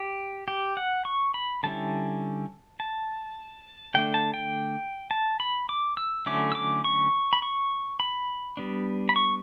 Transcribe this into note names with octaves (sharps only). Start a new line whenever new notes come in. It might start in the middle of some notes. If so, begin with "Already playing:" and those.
Already playing: G4
G4
F#5
C#6
B5
D3 G3 C#4 E4 A5
A5
D3 A3 D4 G5
A5
G5
A5
B5
D6
E6
D3 F#3 A3 C#4 E4 D6
E6
D6
C#6
B5
C#6
B5
G3 B3 D4
B5
C#6